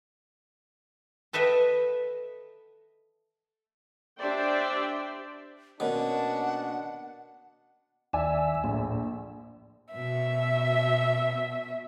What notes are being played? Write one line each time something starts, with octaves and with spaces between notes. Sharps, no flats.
A4 B4 D#5 E5 G5
D4 G4 C5 D5 E5 G5
B2 A#3 C#4 D4 F#5
D#2 D5 E5 G#5
A#1 A2
B2 E5